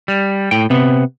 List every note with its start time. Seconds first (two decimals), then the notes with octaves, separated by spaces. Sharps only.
0.08 G3
0.51 A2 G5
0.70 C3 B3